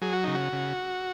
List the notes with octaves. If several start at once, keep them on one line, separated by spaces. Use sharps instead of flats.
F#3 G#4
F#4
C#3 D#4
F#4
C#3